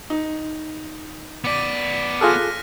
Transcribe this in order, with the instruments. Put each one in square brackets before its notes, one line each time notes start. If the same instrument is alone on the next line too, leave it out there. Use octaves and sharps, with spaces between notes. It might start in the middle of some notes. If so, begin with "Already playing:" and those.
[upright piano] D#4
[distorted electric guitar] B3 D5 [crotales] D6 B6 D#7
[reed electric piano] F4 G#4 A4 [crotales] F6 F#6 A#6